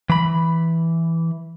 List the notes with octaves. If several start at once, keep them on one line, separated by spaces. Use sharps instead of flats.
E3 B5